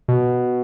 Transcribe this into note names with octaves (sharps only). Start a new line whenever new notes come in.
B2